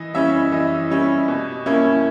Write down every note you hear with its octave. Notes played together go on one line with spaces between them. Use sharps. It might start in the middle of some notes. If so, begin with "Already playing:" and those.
Already playing: E3 D#5
G3 C#4 E4 E5
E3 D#5
G3 C#4 E4
B2
A#3 C#4 E4